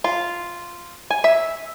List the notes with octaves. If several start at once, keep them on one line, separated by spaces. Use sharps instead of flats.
F4
G#5
E5